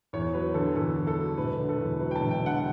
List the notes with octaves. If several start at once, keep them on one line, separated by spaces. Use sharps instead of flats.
E2 C#5
F#3 B4
D3 A4
E2 A4
E2
A4
F#3
E1 B4
D3
A4
E2
F#3 B4
G5
A5
E1
G5
D3 F#5